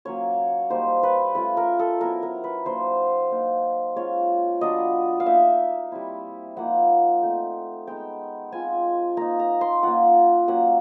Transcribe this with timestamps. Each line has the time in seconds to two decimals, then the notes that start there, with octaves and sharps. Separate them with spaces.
0.05 F#3 A#3 C#4 C#5
0.70 G3 A#3 D#4 C5
1.03 B4
1.35 A3 C#4 F4 B4
1.57 A#4
1.79 A4
2.00 F#3 B3 E4 A#4
2.23 A#4
2.44 B4
2.66 F#3 A#3 D4 C5
3.32 A#3 D#4
3.96 G#3 C#4 F4 C#5
4.61 F#3 B3 D4 F4 D#5
5.20 F5
5.26 A#3 D#4 E5
5.92 G3 C4 E4
6.57 F3 A#3 D#4 F#5
7.23 A3 C4 D#4
7.87 G#3 B3 D#4 G5
8.52 G#3 C4 F4 G#5
9.17 A#3 D#4 A#5
9.39 A#5
9.61 C6
9.83 A#3 C#4 F4 F#5
10.48 F#3 A#3 C#4 F#5